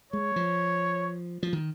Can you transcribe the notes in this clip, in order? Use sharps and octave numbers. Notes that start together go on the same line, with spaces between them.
G#3 C#5
F3
F3
D#3